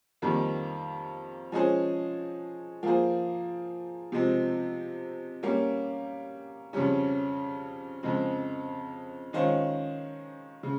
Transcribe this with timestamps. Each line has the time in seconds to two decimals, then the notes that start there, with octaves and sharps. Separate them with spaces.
0.22 F2 D#3 G3 A#3
1.52 F3 G#3 C#4 G#4 C5
2.83 F3 A#3 F4 G#4 C5
4.12 C3 F3 G#3 C4
5.43 G3 A#3 C#4
6.73 F2 C#3 G3 C#4
8.03 F2 C#3 G#3 C4
9.33 D#3 G#3 C#4 F4 C5
10.63 C#3